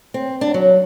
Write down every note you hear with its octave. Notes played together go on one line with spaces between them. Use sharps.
C4
D4
F#3